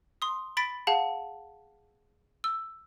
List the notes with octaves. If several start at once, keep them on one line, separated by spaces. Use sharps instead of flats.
C6 D#6
B5 A6 B6 D7
G#4 F5 F#5 A5
E6